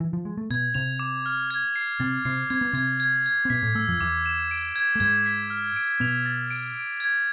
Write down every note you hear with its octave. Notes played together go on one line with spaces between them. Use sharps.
E3
F3
G#3
A3
B2 B3 G#6
C3 C4 F7
D6
F6
G#6
C7
C3 C4 A6
C3 C4 C7
C4 G#6
B3
C3 C4 G#6
G#6
G#6
C4
B2 B3 B6
A2 A3
A2 A3 E6
F2 F3
E2 E3 D6
E7
D7
G#6
A3
G#2 G#3 G#6
B6
F6
D7
B2 B3 F7
A6
D7
D7
G#6